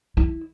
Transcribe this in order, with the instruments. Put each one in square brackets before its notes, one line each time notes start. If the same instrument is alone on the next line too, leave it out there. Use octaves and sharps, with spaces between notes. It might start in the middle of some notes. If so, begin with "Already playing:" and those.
[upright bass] E4